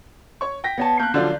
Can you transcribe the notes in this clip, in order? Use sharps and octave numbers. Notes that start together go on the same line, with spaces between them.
C#5 C#6
G5 A#6 B6
B3 C#5 A5
A#3 F#6 G6
D3 F3 F#3 F4 D5 F5